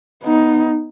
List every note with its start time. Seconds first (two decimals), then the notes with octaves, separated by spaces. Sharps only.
0.24 B3 D#4